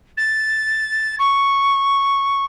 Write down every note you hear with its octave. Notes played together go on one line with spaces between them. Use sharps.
A6
C#6